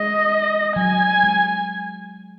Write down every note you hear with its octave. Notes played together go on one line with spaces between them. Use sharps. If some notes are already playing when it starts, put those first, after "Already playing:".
Already playing: G#3 D#5
F#3 G#5
G#3